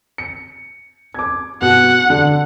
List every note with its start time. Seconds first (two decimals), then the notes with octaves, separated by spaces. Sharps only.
0.18 C#7
1.14 D6 G#6
1.62 B2 F#5
2.10 D3